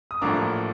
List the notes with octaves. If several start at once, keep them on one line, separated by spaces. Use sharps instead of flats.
D#6
A1 A2 F3 A#3 D4 A#5 D6